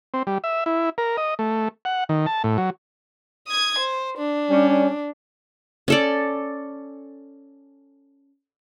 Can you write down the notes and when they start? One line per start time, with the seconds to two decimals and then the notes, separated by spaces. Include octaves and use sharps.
0.14 C4
0.27 G3
0.44 E5
0.66 E4
0.98 A#4
1.17 D#5
1.39 A3
1.85 F#5
2.09 D#3
2.26 A5
2.44 A2
2.58 F#3
3.48 D#6 G#6
3.78 C5
4.18 D4
4.50 G3 C#4
5.88 C#4 A4 D5